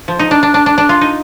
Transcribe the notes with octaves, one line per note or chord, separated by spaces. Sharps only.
F3
D#4
D4
D4
D4
D4
D4
F4
D#4